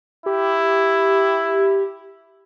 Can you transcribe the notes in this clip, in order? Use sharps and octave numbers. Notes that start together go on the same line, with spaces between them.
E4 G4